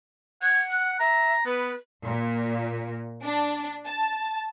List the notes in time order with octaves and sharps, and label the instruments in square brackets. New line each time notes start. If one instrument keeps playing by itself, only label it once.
[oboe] F#5 [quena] G#6
[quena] F#6
[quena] E5 [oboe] A#5
[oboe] B3 [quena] B4
[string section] A#2
D4
A5